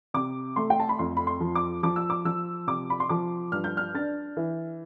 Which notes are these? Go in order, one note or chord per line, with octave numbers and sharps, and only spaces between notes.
C3 D6
A3 C6
G5
A5
B5
F2 C6
B5
C6
F3
D6
F3 D6
E6
D6
F3 E6
C3 D6
B5
C6
F3 D6
G2 F6
G6
F6
D4 A6
E3